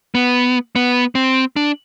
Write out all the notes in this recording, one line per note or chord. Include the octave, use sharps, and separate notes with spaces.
B3
B3
C4
D4